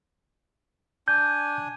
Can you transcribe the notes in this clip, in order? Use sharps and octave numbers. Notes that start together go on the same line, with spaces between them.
D4 G#5 G6